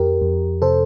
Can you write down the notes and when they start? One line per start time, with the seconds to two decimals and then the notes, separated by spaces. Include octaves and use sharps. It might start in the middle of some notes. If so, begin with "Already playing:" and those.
Already playing: F2 G4 A#4
0.22 F2
0.62 C3 A4 C5